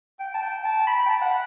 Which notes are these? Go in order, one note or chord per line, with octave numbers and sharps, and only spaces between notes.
G5
A5
G5
A5
B5
G5
A5
F#5